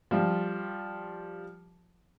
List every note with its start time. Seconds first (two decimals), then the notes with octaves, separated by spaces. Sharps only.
0.11 F3 G3 F4